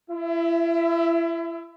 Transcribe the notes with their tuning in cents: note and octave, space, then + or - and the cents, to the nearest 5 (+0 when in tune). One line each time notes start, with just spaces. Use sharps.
E4 +35 E5 +0